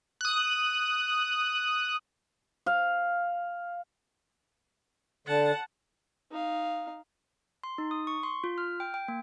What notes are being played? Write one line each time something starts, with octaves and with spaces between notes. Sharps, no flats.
D#6 F#6
F5
D3 F#5 A5
D#4 F5
C6
D#4
D#6
C#6
C6
F4
F6
G5
G5
A#3